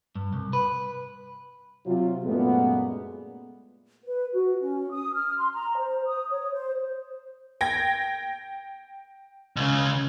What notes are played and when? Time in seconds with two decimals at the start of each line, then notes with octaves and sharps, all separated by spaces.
0.15 G2
0.33 C2
0.53 B4
1.85 C3 F#3 F4
2.24 F#2 A#2 G#3 A3 B3
4.05 B4
4.34 F#4
4.61 C#4
4.91 D#6
5.14 F6
5.38 C6
5.53 A#5
5.77 C5
6.06 D#6
6.30 C#5
6.52 C5
7.61 G5 G#6 A#6
9.57 C#2 C#3